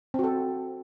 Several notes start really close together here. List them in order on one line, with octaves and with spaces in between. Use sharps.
C4 F#4 A4